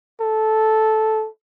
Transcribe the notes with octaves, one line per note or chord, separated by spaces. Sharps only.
A4